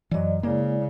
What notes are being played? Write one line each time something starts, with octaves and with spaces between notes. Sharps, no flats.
F#2 E3 F#3 D5 D#5
C#3 G#3 A#3 E4 D5